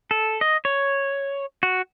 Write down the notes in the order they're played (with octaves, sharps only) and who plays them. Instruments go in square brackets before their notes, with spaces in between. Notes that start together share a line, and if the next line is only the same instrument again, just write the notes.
[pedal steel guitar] A4
D#5
C#5
F#4